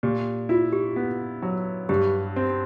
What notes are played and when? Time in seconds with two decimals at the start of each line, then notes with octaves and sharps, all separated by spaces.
0.03 A#2 G4
0.49 E4 F4
0.73 G4
0.96 B3
1.42 F#3
1.89 G2 G4
2.36 C4